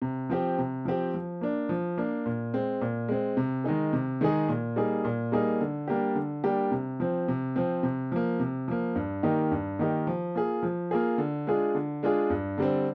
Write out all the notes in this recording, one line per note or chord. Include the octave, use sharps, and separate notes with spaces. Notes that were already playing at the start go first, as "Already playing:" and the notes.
C3
F3 C4 G4
C3
F3 C4 G4
F3
A#3 D4
F3
A#3 D4
A#2
G#3 C4
A#2
G#3 C4
C3
D#3 G#3 D#4 G#4
C3
D#3 G#3 D#4 G#4
A#2
G3 A#3 D#4 G#4
A#2
G3 A#3 D#4 G#4
D3
G3 A#3 D4 G4
D3
G3 A#3 D4 G4
C3
F3 C4
C3
F3 C4
C3
F3 A#3
C3
F3 A#3
G2
D#3 A#3 D#4 G4
G2
D#3 A#3 D#4 G4
F3
A#3 F4 G#4
F3
A#3 F4 G#4
D3
G#3 D4 F4 G#4
D3
G#3 D4 F4 G#4
G2
D3 G3 C4